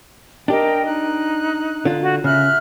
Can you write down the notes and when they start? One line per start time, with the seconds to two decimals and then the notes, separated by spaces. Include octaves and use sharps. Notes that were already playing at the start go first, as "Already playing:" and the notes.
0.48 D4 G4 A#4 D#5 G5
0.86 D#4 F#6
1.85 D3 F4
2.02 F#4
2.24 C#3 E5 F6 F#6